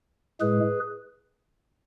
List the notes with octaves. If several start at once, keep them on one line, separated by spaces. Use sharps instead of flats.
A2 G#3 G#4 B4